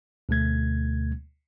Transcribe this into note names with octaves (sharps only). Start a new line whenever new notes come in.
D2 B2 A3 G#6